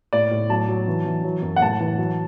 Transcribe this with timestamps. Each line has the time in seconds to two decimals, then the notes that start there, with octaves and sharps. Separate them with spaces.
0.13 A2 D5
0.31 A2
0.49 F#3 A5
0.68 F#3
0.88 E3
1.06 E3
1.24 F#3
1.42 F#2
1.56 F#5
1.61 A2 A5
1.80 E3
1.98 F#3